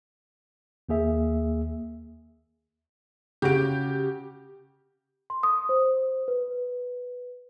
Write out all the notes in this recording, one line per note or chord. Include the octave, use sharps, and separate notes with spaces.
D#2 A#3 G#4 E5
C#3 F#4 G4 D7
C6
D#6
C5
B4